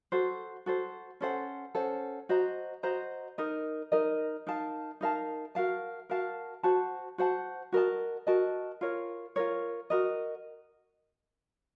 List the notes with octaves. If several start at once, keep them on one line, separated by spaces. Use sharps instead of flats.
F#4 A4 C5
F#4 A4 C5
C#4 A4 C5 F#5
C#4 A4 C5 F#5
F#4 C5 D#5 A#5
F#4 C5 D#5 A#5
D#4 A#4 D#5
D#4 A#4 D#5
D#4 A#4 F5 A5
D#4 A#4 F5 A5
F#4 A#4 F5 A5
F#4 A#4 F5 A5
F#4 C5 F#5 A5
F#4 C5 F#5 A5
F#4 A#4 D#5 A5
F#4 A#4 D#5 A5
F4 A#4 C#5
F4 A#4 C#5
F#4 A#4 D#5